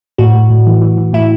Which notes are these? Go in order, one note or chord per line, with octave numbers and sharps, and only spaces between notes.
A2 F#4
A2
A2
E3
E3
E3
A2 E4